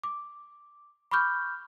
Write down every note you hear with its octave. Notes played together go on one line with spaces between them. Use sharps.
D6
B5 C#6 D6 F6 G6